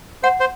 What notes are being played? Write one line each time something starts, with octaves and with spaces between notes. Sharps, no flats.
C5 F#5
C5